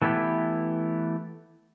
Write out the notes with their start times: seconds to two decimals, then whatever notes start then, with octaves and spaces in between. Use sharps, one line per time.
0.02 E3 A3 B3 E4 G4